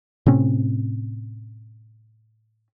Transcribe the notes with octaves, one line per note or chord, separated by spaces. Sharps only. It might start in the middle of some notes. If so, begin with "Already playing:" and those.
A2 C3 C4 C#4